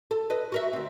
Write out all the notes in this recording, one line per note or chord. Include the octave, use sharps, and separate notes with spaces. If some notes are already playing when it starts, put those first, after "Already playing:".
A4
B4 D#5
F#4 A#4 E5
D2 C4